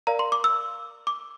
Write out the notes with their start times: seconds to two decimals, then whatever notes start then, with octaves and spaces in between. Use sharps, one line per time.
0.07 A#4 D5 F5 A#5
0.19 C6
0.32 D6
0.44 E6
1.07 D6